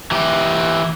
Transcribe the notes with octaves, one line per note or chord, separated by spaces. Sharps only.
E3 G4